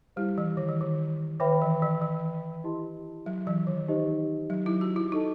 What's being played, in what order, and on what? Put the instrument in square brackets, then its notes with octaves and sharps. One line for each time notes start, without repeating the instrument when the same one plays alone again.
[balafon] G3 [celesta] E4 G4 C5
[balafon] E3
D#3
E3
D#3
[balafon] D#3 [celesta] B4 E5 G5 B5
[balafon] E3
E3
E3
[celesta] E4 G4 D#5 A5 C6
[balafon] F#3
E3
D#3
[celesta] D#4 G4 C5 D#5
[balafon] F#3
E4
F#4
E4
[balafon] D#4 [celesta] F#4 A4 D#5 A5